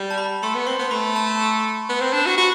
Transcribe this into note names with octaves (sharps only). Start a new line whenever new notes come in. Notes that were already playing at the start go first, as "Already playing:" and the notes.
Already playing: G3
A5
B5
A3 C6
B3
C4 C6
B3 C6
A3 B5
A5
B3
C4
D4
F#4
F#4 B5